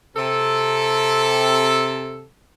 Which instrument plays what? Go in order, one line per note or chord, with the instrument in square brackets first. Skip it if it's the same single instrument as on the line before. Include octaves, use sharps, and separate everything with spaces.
[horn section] C3 A4